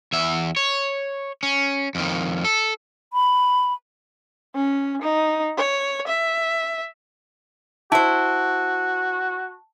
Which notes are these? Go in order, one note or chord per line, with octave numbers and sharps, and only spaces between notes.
E2 E5
C#5
C#4
F2 D#3
A4
B5
C#4
D#4
C#5
E5
E4 F#4 C5 A5